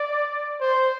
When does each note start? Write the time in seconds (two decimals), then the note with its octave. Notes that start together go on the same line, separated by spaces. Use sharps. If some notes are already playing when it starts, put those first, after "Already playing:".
Already playing: D5
0.58 C5